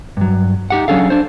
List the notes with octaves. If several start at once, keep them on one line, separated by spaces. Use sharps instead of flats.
G2 F#3
D#4 G4 F#5
F#3 C#4 D4 G#4 A4 F5
D4 C5